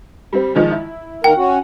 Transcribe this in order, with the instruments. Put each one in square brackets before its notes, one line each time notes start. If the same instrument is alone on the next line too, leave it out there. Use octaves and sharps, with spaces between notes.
[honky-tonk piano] G3 C4
D#3 F3 G#3
E4
[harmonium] D#3 A#3 A#4 [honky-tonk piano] F#5 [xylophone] G5
[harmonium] C#4 F#4